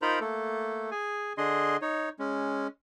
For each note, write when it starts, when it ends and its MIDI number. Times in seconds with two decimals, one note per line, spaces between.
0.02 0.19 63
0.02 0.19 65
0.02 0.19 70
0.02 0.19 72
0.02 0.19 82
0.02 0.19 83
0.20 0.90 57
0.20 0.90 58
0.20 0.90 69
0.91 1.33 68
0.91 1.33 80
1.38 1.77 50
1.38 1.77 62
1.38 1.77 68
1.38 1.77 75
1.38 1.77 84
1.82 2.09 63
1.82 2.09 73
2.19 2.67 56
2.19 2.67 61